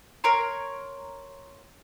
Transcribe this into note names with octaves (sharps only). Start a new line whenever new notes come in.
A#4 C#5 A#5 C6